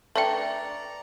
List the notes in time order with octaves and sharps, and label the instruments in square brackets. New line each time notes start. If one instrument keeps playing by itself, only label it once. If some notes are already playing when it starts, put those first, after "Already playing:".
[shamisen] A3 D4 [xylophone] B4 E5 G5 [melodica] D5 A#5